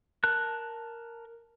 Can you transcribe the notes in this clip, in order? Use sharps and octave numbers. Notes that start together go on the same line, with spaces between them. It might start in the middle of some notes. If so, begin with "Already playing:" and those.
A#4 A5 F#6